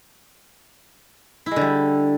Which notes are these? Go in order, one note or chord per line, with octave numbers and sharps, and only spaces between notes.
E4
G#3
D3
G3